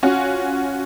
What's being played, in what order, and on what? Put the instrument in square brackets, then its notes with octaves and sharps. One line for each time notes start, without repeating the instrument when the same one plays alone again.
[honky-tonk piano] C#4 F4 F#4